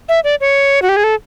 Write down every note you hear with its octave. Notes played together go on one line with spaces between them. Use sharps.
E5
D5
C#5
F#4
G4
G#4
A4